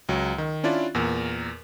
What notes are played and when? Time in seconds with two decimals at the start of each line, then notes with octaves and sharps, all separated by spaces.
0.09 C#2 F#3
0.38 D#3
0.64 C#4 D4 E4 F4 D5
0.95 E2 A#2 A#4